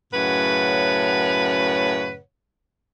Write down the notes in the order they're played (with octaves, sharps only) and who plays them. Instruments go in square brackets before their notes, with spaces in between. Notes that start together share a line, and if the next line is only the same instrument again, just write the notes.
[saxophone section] F#2 A2 C#3 B4 C#5 F#5